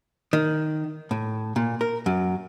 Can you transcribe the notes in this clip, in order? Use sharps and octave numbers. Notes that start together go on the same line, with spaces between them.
D#3
A2
A#2
A#4
F#2